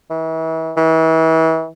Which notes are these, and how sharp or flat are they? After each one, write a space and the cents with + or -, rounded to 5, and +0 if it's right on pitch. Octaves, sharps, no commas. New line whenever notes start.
E3 -35
E3 -35